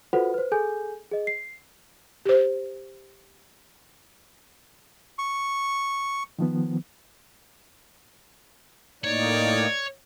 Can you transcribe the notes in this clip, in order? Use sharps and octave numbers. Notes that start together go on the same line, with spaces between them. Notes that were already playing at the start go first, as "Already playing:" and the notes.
F4 F#4 A4 B4 C5 F#5
B4 C5
G#4 A4 G#5 G6
G#4 D#5
C7
G4 C5
C#6
D#3 F3 B3
A2 A#3 D#4 C#5 D5